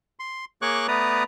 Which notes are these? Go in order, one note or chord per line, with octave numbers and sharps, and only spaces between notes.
C6
A#3 G#4 C#5 C#6 D6 F#6
A3 B3 B4 D5 A#5 D#6